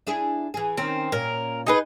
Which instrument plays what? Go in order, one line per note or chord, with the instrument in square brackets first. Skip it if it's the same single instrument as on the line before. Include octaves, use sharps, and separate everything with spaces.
[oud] D4 E4 G#4
E3 G#4
[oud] D#3 C#4 [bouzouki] C4
[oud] A#2 C#4 [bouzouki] A#4
[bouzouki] D#4 G#4 B4